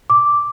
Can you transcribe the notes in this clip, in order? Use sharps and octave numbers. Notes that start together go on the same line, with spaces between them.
D6